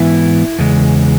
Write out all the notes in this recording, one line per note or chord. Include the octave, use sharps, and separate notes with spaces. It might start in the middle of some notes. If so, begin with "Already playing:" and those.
Already playing: G#2 E3 B3 E4
E2 C#3 G#3